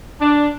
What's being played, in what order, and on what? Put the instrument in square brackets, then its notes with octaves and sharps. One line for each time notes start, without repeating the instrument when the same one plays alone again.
[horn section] D4